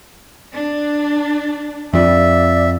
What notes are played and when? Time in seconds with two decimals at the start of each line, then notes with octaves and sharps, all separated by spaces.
0.54 D4
1.94 F2 F3 D5 E5